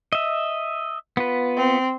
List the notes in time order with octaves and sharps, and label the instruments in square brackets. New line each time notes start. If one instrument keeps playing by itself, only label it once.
[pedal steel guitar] D#5 E5
B3 F4 B4
[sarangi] C4